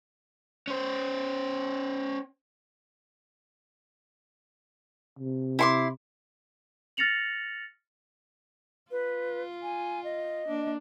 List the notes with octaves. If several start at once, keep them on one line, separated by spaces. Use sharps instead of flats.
C#4 C5
C3
E4 C6 D6
F6 A6 A#6 C#7 F7 F#7
F4 B4
G#5
D#5
A#3 D4